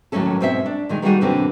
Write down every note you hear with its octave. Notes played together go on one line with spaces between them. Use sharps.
D#2 A2 F#3 A3 C#4 A4
G#2 B2 C4 C#4 G4 E5
D4
A#2 D#3 G#3
D#3 G3 A#3 C#4 F#4 G#4
F#2 B2 D3 E3 A#3 C4